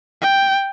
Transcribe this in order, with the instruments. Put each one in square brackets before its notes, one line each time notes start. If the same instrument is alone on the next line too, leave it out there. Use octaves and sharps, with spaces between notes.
[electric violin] G5